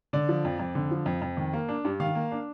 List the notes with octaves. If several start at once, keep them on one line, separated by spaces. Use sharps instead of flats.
D3 D5
F3
F2
F2
D3
F3
F2
F2
D#3
A#3
D4
G2
D#3 F5
A#3
D4